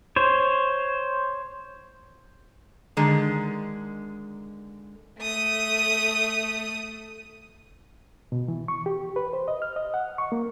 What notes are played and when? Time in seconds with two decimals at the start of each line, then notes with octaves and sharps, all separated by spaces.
0.16 C5 C#5
2.97 D3 D#3 G#3
5.19 A3 D#6
8.32 B2
8.48 E3
8.68 C#6
8.86 G4
9.16 B4
9.33 C5
9.48 D#5
9.62 F6
9.76 D#5
9.94 F#5
10.18 C#6
10.32 A#3